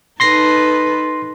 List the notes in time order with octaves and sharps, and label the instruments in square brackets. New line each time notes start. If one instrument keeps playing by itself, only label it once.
[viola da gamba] D#4 A4 B4 [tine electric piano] C6 A#6 C7